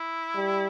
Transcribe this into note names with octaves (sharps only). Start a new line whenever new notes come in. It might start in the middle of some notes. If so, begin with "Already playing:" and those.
Already playing: E4
G3